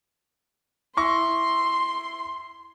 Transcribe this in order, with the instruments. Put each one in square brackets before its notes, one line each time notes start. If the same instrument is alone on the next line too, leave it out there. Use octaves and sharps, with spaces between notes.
[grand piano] E4 C#6 A#6 [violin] C6